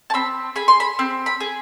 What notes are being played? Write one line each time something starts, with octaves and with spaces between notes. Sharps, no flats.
A5
C4 B5
G#4 B5
C6
B5
C4
B5
G#4